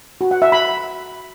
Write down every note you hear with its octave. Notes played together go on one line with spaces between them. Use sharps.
F#4
F#5
E5
B5